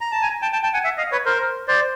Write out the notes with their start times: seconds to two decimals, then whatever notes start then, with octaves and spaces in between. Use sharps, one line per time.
0.01 A#5
0.12 A5
0.22 G#5 A#5
0.42 G5 A5
0.53 G5 A5
0.63 G5 A5
0.73 F#5 G#5
0.84 E5 F#5
0.98 D#5 F5
1.12 B4 C#5
1.25 A#4 C5
1.68 C5 D5